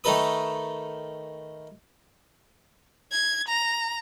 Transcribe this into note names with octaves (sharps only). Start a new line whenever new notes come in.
D#3 A3 D#4 A4 B4 D#6
G#6
A#5